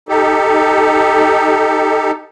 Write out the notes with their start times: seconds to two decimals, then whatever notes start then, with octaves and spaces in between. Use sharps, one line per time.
0.09 D#4 G4 A4